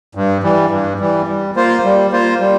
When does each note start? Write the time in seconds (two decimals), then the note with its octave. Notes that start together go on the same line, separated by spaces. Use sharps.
0.15 G2
0.43 E3 G3
0.71 G2
1.00 E3 G3
1.28 G3
1.56 A#3 F4 C5
1.84 G3
2.12 A#3 F4 C5
2.40 G3